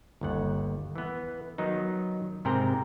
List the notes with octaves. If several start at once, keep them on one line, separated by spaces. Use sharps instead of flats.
G1 D#2 F#5
E3 B3
D#3 F#3 B3 D#4
G#2 C3 C4 A#4 G5 A#5